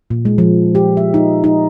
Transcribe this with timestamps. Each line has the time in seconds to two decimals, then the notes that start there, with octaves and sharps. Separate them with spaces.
0.10 A#2
0.25 G#3
0.38 F3
0.75 G4
0.97 E5
1.14 D#4
1.44 D#4